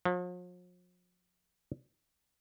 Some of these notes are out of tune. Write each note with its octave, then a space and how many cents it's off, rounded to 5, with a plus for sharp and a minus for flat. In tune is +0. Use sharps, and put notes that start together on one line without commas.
F3 +45